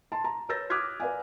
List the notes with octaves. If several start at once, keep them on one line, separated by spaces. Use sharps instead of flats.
A5 C6
A#5
B4 C#5 E6 G6 A6 A#6
D6 D#6 F6 F#6 G#6 B6
B4 D5 F5 G#5